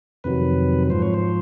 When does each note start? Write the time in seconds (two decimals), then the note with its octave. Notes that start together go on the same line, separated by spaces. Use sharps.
0.24 F2 C3 D#3 F#3 B4
0.90 G#2 F3 C5
1.02 C#5
1.14 C5